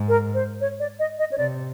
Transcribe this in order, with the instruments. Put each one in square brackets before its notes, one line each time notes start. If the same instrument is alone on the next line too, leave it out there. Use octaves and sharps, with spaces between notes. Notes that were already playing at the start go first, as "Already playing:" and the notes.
Already playing: [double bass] G#2
[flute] A#4
C5
C#5
D5
D#5
D#5
C#5
[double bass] C3 [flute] D5